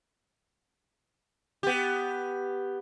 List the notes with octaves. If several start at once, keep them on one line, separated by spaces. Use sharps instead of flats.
B3 G4